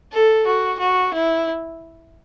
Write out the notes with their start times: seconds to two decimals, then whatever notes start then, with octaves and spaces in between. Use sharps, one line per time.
0.12 A4
0.47 F#4
0.79 F#4
1.14 E4